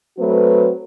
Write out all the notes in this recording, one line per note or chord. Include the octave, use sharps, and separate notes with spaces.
F#3 A3 C4 F#4 B4